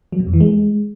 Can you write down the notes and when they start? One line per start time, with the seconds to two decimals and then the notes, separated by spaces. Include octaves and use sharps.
0.12 F#3
0.19 B2
0.26 F2
0.33 E3
0.40 G#3